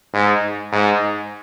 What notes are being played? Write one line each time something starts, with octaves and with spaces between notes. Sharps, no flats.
G#2
G#2